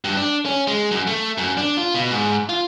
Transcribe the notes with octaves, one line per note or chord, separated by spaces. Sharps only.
G2
D4
C#4
G#3
F#2
A3
F#2
D4
F4
B2
G#2
F4